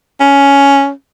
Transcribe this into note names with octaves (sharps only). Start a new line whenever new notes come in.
C#4